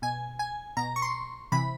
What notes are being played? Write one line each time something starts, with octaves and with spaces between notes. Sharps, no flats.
B2 G#5
G#5
B2 A#5
C#6
C6
C3 E3 B5